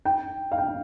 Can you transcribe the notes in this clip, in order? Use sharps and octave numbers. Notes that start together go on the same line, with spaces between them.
G5
F5
G5